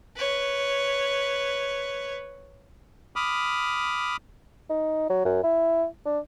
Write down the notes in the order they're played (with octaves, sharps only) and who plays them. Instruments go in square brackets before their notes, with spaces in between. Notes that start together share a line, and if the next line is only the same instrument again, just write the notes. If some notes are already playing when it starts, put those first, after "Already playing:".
[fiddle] B4 C#5
[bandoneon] B5 D6 D#6 F6
[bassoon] D#4
F#3
F#2
E4
D4